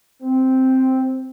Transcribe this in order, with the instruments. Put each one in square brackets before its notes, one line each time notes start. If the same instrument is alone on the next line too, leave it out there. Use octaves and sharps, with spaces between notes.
[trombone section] C4